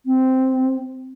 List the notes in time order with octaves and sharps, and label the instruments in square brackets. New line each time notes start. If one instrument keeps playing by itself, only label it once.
[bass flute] C4